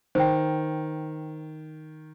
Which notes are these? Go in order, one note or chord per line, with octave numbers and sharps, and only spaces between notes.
D#3 C5 G5